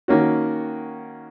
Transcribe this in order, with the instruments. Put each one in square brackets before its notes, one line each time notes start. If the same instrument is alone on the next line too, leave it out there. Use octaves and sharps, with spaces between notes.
[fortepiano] D#3 A#3 C#4 F#4